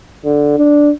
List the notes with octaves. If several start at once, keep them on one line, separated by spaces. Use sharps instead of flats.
D3
D4